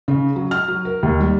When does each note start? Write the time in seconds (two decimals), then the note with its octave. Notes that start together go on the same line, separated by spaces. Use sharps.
0.08 C#3
0.36 F#3
0.51 F6
0.68 F#3
0.85 A#4
1.03 D#2
1.20 G3